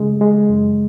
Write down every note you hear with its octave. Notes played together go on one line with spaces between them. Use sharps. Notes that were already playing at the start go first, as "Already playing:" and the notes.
Already playing: C#3 G#3
G#3
F#2